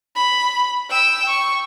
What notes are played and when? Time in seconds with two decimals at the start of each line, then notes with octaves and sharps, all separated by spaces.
0.16 B5
0.90 G5 E6
1.29 C#6